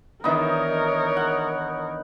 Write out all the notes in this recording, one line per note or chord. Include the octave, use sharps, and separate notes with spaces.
D#3 E3 B3 D4 D#4 A#4 C#5
F#5